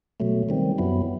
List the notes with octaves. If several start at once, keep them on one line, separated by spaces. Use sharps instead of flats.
B2 F#3 A3
D#3 G3 C4
F#2 F#3 B3 E4